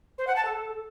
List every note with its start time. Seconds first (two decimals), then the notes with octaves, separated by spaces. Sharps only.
0.18 C5
0.27 F#5
0.36 A5
0.45 A4